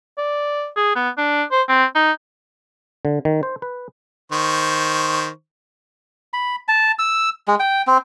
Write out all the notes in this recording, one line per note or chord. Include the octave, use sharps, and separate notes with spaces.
D5
G#4
B3
D4
C5
C4
D#4
D3
D#3
C5
B4
D#3 C5 C#6
B5
A5
E6
G#3
G5
C4